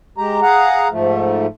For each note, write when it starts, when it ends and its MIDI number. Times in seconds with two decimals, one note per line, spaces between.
0.18 0.40 56
0.18 0.40 67
0.18 0.40 82
0.42 0.88 68
0.42 0.88 77
0.42 0.88 78
0.42 0.88 82
0.91 1.46 44
0.91 1.46 53
0.91 1.46 57